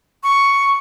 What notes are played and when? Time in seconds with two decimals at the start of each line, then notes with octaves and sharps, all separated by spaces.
0.23 C#6